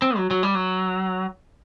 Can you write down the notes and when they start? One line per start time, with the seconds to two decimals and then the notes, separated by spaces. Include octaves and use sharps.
0.02 C4
0.17 F#3
0.31 F#3
0.43 G3
0.55 F#3